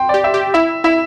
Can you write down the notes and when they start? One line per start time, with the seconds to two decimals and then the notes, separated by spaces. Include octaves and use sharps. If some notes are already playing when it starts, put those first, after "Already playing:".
Already playing: G5 C6
0.09 G4 D5
0.24 E5
0.34 G4
0.54 E4 E5
0.84 E4 E5